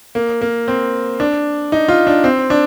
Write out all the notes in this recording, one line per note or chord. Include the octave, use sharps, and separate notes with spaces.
A#3
A#3
C4
D4
D#4
F4
D4
C4
D4